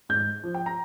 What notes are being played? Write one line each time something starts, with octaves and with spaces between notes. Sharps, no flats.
G#2 G6
F3
G5
A#5